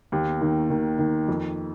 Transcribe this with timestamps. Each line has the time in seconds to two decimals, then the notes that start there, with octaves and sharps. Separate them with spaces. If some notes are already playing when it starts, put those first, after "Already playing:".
0.12 D#2
0.41 D#3
0.70 D#3
0.99 D#3
1.28 F2